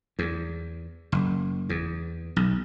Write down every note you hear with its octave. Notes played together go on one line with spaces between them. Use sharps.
E2
F#1
E2
B1